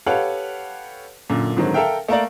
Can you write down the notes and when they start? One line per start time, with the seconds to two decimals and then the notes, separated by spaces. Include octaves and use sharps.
0.06 G4 A4 B4 C#5 F5 F#5
1.30 F#2 A#2 D3
1.56 G#2 D3 D#3 F#3 C4
1.74 A4 A#4 E5 F5 G5
2.08 A3 A#3 A#4 D5